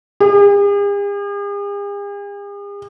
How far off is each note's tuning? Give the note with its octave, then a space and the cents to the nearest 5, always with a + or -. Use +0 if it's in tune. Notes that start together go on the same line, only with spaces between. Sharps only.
G#4 -45